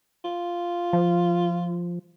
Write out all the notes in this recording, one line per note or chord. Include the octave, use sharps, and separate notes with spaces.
F4
F3